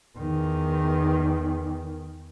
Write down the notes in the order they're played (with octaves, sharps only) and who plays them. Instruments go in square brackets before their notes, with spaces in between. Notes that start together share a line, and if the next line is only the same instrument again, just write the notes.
[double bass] E2 D#3